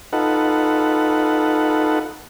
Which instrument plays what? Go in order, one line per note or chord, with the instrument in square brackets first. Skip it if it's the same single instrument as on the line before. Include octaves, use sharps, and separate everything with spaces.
[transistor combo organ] D#4 F4 A4 B4 F#5